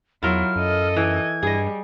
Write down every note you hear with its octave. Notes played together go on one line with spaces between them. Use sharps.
E2 F#3 E4 F4 A#4 F6
F#2 A4 D#5
E3 G#6
G2 G3 G#4 D#5